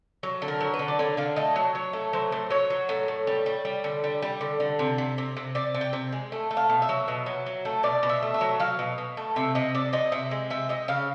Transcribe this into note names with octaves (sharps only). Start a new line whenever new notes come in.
F#3
D3
A#4
F#3
B4
D3
D5
D3 C#5
D3 F5
A3 D#5
F#3
F#3 C#5
A3
F#3 C5
A2
F#3 C#5
F#3
A2
A2
G3
G3
G3
D3
G3
G3
D3
D3
C3
C3
C3
C3
C3 D5
C3
G5
C3
G#3
A3
A3
F5
B2
E5
F#3
B2
F#3
F#3
A3
B2 D5
B2
E5
A3
E5
F#3
F#3 F5
B2
B2
A3
C3 E5
C3 D#5
C3 D5
C3 D#5
C3 E5
G#3
C3 E5
C3 D#5
C#3 F5